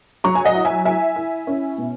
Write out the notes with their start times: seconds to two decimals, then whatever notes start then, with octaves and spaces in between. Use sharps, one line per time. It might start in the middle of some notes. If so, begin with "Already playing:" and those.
0.24 F#3 A#5 C#6
0.35 G#5
0.45 D#5 F#5
0.55 E4
0.65 E5 G#5
0.85 E4 E5 G#5
1.16 E4
1.47 C#4
1.78 B2